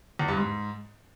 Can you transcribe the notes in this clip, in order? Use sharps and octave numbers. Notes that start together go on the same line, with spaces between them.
E2
G2
G#2